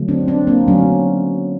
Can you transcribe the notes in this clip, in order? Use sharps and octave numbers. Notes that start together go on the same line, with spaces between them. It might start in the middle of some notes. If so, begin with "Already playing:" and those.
Already playing: D3 F#3 A3
C4 D4
C4 D4
A#3 C4
D3 F#3 A3 C#4
C4